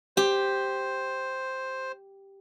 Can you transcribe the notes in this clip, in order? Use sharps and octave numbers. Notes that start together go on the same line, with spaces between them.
G4 C5